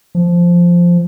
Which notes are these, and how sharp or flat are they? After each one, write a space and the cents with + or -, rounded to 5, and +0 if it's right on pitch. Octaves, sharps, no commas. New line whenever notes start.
F3 -5